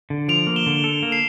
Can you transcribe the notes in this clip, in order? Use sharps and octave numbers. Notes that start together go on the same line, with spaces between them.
D3
F3 D7 F7
A#3
E7 G7
D3
A4
A#3
C7 E7